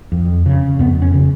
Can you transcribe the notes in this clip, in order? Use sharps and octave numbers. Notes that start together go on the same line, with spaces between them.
F2
C#3
F2 B3
C#4
C#3